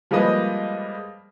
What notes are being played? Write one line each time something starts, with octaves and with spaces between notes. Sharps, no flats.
F3 G3 G#3 A#3 B4 D#5